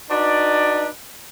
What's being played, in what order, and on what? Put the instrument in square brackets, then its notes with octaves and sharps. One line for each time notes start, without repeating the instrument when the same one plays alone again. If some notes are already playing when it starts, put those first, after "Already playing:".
[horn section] D4 D#4 F#4 B4 D5